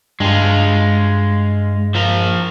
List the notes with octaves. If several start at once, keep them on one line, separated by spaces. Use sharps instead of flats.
G2 G#3 F4
F3 A#4